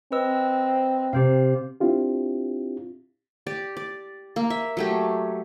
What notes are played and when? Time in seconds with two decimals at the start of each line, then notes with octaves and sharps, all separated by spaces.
0.12 C4 B4 D#5 E6
1.13 C3 G4 C5 F5
1.80 C4 D4 E4 F4 G4
3.46 G4 D5
3.77 D5
4.36 A#3
4.50 E5
4.77 F#3 A3 G4